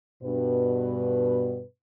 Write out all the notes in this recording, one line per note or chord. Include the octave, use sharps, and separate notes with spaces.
G2 B2 B4